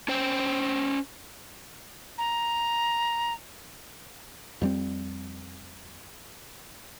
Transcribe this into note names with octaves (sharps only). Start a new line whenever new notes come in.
C#4 C5 G5
A#5
F2 G3 C4